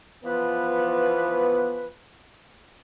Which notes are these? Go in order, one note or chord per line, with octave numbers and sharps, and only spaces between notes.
E3 F3 B3 B4